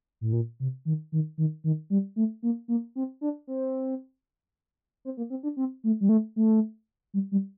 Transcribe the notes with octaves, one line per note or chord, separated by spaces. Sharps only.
A2
A#2
C3
D#3
D#3
D#3
D#3
G3
A3
A#3
A#3
C4
D4
C4
C4
A#3
C4
D4
C4
A3
G3
A3
A3
G3
G3